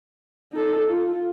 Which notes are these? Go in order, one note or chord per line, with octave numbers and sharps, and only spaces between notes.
D#4 A4
F4